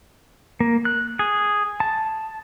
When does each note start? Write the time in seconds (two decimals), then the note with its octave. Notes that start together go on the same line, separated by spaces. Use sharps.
0.60 A#3
0.85 F#6
1.19 G#4
1.80 A5